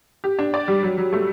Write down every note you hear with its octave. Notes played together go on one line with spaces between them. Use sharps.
G4
D4
D5
G3
F#3
F#3
A3